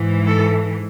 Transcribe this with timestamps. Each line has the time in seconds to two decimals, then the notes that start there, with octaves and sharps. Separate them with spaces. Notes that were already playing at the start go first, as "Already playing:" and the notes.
Already playing: G#2 E3
0.26 A4